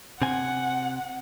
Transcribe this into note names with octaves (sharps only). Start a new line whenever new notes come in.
C3 C4 F#5 G#5